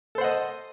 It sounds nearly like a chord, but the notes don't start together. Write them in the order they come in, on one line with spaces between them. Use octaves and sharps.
A4 C5 F#5 D#5